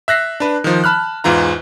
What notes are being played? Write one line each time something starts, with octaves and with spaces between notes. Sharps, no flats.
E5 F#6 A#6 C7
D4 B4
D#3 F3
A5 B5 F6 F#6
E2 G#2 E3 F4 A#5